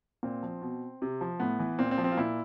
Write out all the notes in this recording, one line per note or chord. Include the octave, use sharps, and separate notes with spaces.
A#2 C4
F3
B2
C3
F3
A2 B3
E3
A#2 C4
C4
F3
C4
F4
A#2 E4